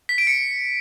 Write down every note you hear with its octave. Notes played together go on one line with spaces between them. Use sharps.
B6
D7
C#7